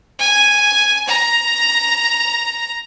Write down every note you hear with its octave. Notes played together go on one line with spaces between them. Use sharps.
G#5
A#5